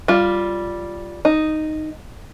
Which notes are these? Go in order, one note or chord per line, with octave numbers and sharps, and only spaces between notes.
G3 F4
D#4